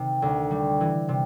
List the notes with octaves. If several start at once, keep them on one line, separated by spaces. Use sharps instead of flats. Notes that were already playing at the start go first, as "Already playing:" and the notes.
Already playing: C3 D#3
D2
G3
E3
C3